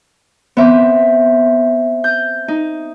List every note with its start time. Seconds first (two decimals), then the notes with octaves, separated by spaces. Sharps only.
0.57 B3 C4 E5
2.04 G6
2.48 D#4